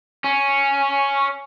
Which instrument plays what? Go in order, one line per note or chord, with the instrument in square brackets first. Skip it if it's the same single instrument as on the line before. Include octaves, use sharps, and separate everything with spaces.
[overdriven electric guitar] C#4